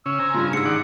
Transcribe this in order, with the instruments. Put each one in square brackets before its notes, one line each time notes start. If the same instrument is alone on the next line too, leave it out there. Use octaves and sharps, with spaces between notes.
[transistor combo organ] C#3 C#4 [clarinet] E6
[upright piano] C5 [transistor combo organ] G#5 A#5
[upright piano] G2 C#3 [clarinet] F4
[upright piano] G#2 [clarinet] G#4 [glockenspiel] E6 C#7
[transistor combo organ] D#3 D5 F#5